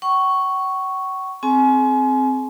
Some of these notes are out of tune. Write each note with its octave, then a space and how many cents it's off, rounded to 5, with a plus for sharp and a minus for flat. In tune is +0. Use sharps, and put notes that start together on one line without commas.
F#5 +45 C#6 +0
C4 +0 G#4 +40 G#5 +30